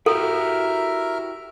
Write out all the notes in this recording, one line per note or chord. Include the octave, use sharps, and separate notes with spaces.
E4 F#4 G4 A4 A#4 E5 F6